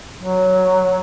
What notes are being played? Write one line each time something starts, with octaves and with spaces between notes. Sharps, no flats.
F#3